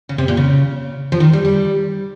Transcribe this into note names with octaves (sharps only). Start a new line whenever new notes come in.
C#3
C3
A#2
C#3
F3
D#3
G3
G3